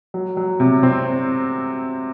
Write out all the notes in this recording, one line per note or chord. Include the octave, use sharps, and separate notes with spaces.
F#3
F#3
C3
C4